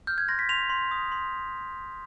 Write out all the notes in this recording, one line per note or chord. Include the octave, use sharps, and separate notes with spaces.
F6 G6
G#6
C6 A#6
B6
C6 F7
C6
D#6
C6